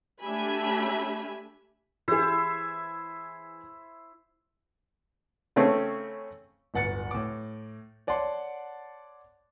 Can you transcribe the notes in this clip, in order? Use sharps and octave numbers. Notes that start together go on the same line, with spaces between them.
A3 D4 G4 E5 G#5 B5
E3 E4 G4 G#4 C5 E5
C#3 A3 C4 C#4
D1 G1 F#5 A6 C#7
A2 D6
C#5 D5 F#5 A5 C6